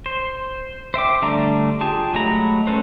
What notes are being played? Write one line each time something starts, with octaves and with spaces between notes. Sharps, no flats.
C5
C5 E5 G5 D6
D3 G3 A3 D4 A#5
F4 G4 G#4 A5
F#3 G#3 A3 A#5 B5
A3 C#4 A4 B4 C5